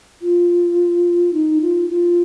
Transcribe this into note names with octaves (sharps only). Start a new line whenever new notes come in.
F4
D#4
F4
F4